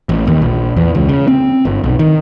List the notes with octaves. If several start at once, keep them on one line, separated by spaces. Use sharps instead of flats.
A1
D#2
A#1
E2
C#2
C#3
C4
G1
B1
D#3